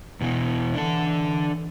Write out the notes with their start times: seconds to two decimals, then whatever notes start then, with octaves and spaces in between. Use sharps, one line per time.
0.21 E2 B2 E3
0.74 E3 D4 A4